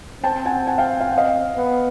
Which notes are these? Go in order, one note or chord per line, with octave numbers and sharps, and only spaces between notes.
C4 G5 A5
F#5 G#5
F#5 G#5
F5 G5
F5
F#5
D#5 F5
B3